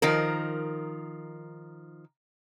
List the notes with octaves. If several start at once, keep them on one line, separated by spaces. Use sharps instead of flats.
D#3 F3 A#4